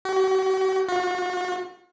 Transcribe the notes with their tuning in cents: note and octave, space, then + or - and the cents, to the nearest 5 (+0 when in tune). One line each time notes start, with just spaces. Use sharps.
F#4 +45
F#4 -40